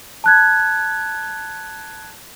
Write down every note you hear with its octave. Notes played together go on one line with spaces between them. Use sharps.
A5 F#6 G#6